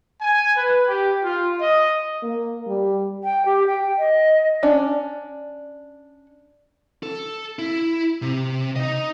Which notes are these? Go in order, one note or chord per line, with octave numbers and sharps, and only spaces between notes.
G#5
B4
G4
F4
D#5
A#3
G3
G5
G4
G5
D#5
C#4 D4 D5
A4
E4
C3
D#4 D#5